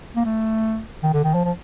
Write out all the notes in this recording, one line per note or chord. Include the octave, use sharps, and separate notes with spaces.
A#3
A3
D#3
D3
D#3
F3
F3